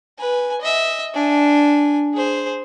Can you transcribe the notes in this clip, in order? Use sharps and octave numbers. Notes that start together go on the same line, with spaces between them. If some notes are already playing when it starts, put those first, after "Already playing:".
B4 G#5
D#5 E5
D4 G#5
G#4 C5